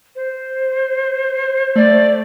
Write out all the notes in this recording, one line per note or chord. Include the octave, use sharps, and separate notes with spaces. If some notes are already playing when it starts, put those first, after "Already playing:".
C5
A3 D5